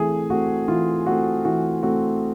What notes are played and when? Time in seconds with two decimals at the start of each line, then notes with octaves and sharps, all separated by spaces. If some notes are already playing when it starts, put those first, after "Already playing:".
Already playing: E3 A3 C4 G#4
0.30 A3 C4 F#4
0.68 E3 F4
1.06 A3 C4 F#4
1.45 E3 F#4
1.83 A3 C4 F#4